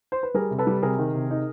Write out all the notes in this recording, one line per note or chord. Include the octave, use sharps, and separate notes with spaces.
C5
B4
G3 G#4 A#4
C3
A4 B4
G3
C3 G#4 A#4
D#3
C3
D#4